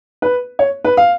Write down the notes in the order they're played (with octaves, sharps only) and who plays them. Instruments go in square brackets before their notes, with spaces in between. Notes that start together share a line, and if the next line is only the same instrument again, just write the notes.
[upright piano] B4
C#5
B4
F5